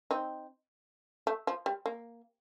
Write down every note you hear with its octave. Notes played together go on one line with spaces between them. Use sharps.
C4 D#4
A3
F3
G3
A#3